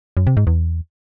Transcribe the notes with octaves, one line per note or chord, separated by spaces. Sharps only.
F#2
C3
G#2
E2